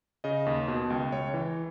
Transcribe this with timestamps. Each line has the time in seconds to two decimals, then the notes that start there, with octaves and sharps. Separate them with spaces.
0.24 C#3 D#5
0.46 D#2
0.68 B2
0.90 C#2
1.12 C#2 C#5
1.34 E3